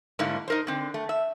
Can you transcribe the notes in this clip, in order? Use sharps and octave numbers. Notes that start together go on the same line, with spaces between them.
G#2 D3 G3 A3 A#3 E4
D#4 A#4 C5
D3 C4
A3
E5